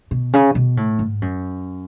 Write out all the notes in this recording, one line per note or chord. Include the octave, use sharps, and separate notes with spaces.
B2
C#3
B2
A2
G#2
F#2